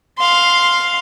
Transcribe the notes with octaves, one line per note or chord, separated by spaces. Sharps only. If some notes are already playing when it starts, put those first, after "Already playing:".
F5 C6